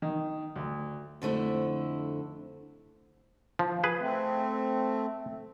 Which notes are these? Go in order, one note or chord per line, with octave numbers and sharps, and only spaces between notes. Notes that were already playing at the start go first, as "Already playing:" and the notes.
D#3
D2
F2 D3 A3 E4
F3
G#4 B4
A3 C4